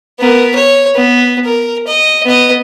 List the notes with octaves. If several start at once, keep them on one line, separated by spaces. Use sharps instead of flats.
B3 A#4
C#5
B3
A#4
D#5
B3 D#5